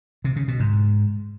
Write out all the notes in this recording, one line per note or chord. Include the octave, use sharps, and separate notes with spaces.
C3
C#3
B2
G#2